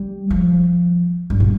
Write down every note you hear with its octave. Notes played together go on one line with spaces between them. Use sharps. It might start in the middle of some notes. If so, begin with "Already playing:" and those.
Already playing: G3
F3
G2
A#2